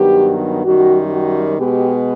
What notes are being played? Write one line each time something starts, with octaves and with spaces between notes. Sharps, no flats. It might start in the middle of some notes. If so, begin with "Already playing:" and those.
Already playing: G2 D#3 F#3 B3 G4
F#2 D#3 G3 F#4
F#4
B2 G#3 B3 G4